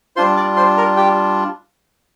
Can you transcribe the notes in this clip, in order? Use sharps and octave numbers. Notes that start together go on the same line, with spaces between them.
G3 D4 F4 C5 C6
D5 D6
C5 C6
A#4 A#5
G4 G5